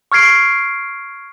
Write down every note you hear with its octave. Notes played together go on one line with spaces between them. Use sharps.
C#6 F6 G#6 C7 D7